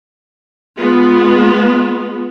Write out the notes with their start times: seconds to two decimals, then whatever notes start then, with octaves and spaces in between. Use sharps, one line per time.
0.77 G#3 B3 F4